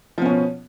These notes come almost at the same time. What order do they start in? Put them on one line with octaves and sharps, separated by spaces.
F3 B3 C#4 B2